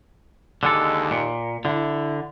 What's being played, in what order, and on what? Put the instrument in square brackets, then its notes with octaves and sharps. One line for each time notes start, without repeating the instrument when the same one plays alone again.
[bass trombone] D#2 [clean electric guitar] D3 G#3 A4
[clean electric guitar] A#2
[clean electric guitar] D3 [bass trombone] E4